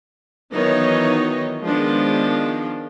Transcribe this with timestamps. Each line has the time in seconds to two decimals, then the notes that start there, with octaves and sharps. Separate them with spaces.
0.53 D#3 E3 F#3 B3 D#4 C#5
1.62 D#3 F3 G#3 B3 D4